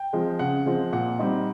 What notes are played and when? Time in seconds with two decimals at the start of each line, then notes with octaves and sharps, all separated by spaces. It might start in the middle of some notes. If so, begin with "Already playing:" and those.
Already playing: G5
0.13 F3 G#3 C4
0.39 C#3 F#5
0.66 F3 G#3 C4
0.92 A#2 F#5
1.19 G3 C4 D#4